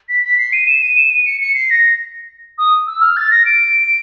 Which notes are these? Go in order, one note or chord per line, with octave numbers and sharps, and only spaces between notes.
B6
B6
C7
D#7
E7
D#7
E7
D#7
C#7
C#7
C7
A#6
D#6
E6
F6
A6
A#6
D7